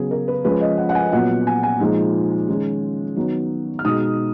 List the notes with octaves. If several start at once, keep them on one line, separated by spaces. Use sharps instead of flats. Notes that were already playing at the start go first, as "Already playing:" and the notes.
Already playing: C#3 F#3 B3 G#4
A#4
B4
F3 G#3 C#4 B4
D#5
F#5
F#5
G#5
A#2 F#3 B3 F#5
G#5
G#5
A#2 F3 G#3 D#4
D#3 G#3 C#4
D#3 F#3 B3
F6
B2 G#3 D#4 D#6